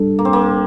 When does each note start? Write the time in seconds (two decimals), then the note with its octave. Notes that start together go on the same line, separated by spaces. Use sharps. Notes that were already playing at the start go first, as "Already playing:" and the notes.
Already playing: G3 D4 A4
0.19 A#3
0.25 C4
0.33 A#3